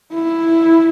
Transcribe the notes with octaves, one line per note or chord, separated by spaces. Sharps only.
E4